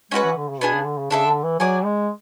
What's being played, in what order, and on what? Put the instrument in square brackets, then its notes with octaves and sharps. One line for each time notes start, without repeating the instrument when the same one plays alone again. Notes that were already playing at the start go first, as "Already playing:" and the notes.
[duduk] G#3 [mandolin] C#4 F#4 B4 F#5
[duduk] E3
D3
C#3
[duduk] B2 [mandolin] B3 D4 G#4
[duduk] C#3
D3
C#3
[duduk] C#3 [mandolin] D4 A4 E5
[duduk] D3
E3
[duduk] F#3 [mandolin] G#4 D5 G#5
[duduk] G#3